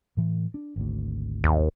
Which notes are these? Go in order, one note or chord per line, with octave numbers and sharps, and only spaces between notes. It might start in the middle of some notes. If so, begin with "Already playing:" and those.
A2 E3
D4
G#1 D2
D#2